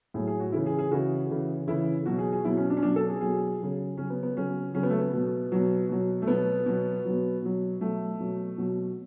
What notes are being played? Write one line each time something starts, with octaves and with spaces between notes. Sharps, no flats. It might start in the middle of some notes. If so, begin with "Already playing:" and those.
A2 F#3 G#4
G#4
F#4
C#3 E3 E4
G#4
G#4
C#3 E3 F#4
C#3 E3
C#3 E3 E4
B2 F#3 F#4
G#4
G#4
B2 F#3 E4
C#4
D4
C#4
B2 F#3 D4
A4
G#4
B2 F#3 G#4
C#3 F#3
C#3 F#3 C#4
B3
B3
C#3 F#3 C#4
C#3 F#3 C#4
B3
A3
B3
B2 F#3
B2 F#3
B2 F#3
A3
B2 F#3 B3
B2 F#3
B2 F#3
B2 F#3
B2 F#3 A3
B2 F#3
B2 F#3